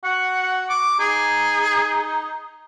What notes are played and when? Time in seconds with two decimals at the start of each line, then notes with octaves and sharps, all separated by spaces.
0.04 F#4 F#5
0.70 D6
0.99 D#4 G#4